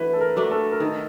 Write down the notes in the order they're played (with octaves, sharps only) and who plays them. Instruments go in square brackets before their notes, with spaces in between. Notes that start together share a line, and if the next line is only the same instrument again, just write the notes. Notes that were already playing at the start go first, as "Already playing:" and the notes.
Already playing: [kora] E3 A3 D4 F#4 [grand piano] B4
[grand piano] A4
A#4
[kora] A3 D4 F#4
[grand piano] A4
A#4
[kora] D#3 [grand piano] A4